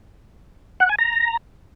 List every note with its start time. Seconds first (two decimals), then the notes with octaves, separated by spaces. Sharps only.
0.80 F#5
0.89 G#5
0.99 A#5